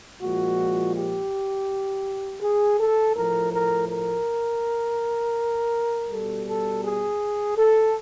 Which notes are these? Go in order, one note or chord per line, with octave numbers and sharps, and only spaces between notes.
A#2 F3 G#3 F#4
G4
G#4
A4
A2 F3 A3 A#4
A#4
A#4
B2 G3 A4
A4
G#4
A4